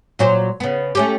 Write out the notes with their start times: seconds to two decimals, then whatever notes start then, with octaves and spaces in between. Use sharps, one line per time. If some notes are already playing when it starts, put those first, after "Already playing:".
0.19 A#2 F#3 C5
0.60 C#3 B3
0.95 A3 C#4 G4